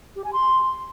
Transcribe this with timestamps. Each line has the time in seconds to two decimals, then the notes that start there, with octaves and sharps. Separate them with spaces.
0.16 G4
0.24 G#5
0.33 C6